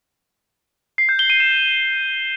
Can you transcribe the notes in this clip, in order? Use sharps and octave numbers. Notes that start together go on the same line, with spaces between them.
C7
G6
G7
D#7
E7